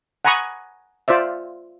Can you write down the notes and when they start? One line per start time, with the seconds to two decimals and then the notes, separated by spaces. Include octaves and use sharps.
0.25 F#5 G#5 A#5 B5 C#6 D#6
1.08 F4 C5 D5 E5